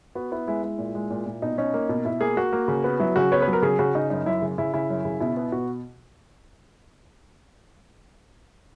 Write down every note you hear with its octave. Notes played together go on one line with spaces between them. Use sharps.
B3 F#4
B3 E4
G#3 E4
G#3 E4
A#2
G#3
A#2
A#2
B2 D#4
C#4 D#4
A#3
B2
B2 E4
A#3 G#4
A#3 F#4
A#3
C#3
B3
F#3 E4
C#3 F#4
B3 C#5
B4
F#3
A#4
C#3 G#4
C#3 F#4
C#3 D#4
F#2 D#4
F#2 E4
C#3
C#3 E4
C#3 E4
F#2
C#3
B2 E4
B3 E4
B2 F#4